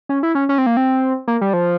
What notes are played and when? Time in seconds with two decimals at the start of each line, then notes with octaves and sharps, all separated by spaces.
0.09 C#4
0.23 E4
0.35 C#4
0.49 C#4
0.58 C4
0.66 A#3
0.77 C4
1.28 A#3
1.41 G3
1.53 F3